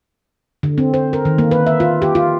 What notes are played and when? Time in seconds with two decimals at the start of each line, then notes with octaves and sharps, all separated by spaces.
0.63 D3
0.78 C4
0.94 C5
1.13 A#4
1.25 D#3
1.38 A#3
1.51 B4
1.67 E5
1.80 F4
2.02 G4
2.15 F4